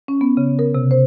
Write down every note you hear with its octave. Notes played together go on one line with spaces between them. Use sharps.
C#4
B3
C#3
A#4
C3
C5